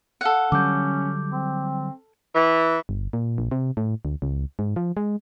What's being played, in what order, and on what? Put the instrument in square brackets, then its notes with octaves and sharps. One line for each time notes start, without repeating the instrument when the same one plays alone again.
[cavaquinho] A4 F5 F#5
[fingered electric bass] D3 F#3 G3 [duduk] C#4 [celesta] D6 G6
[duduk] C4
[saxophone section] E3
[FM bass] G1
A#2
A#1
C3
A2
D2
C#2
G#2
F3
G#3